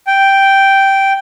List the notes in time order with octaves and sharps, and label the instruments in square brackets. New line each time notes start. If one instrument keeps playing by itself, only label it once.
[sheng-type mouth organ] G5